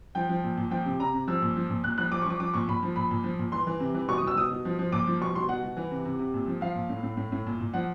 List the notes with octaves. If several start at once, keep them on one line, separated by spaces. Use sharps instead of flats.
F3 G5
F3
A#2
A#2
F3 G5
C3
C3 A#5
C3
F3 E6
A#2
F3
A#2
A#2 F#6
F3 F#6
F3 D6
C#6
F3 D6
F3 D6
A#2 C#6
A#2 B5
F3
A#2 B5
A#2
F3
A#2
E3 C6
E3
C3
E3
B2 C#6
D#6
B2
E6
B2 D#6
B2
F3
F3
A#2 D6
F3
B2 C#6
B2 C6
B2 F#5
B2
E3
C3
C3
C3
A#2
F3
F3 F5
A#2
A2
A2
A2
A2
A#2
A#2
F3 F#5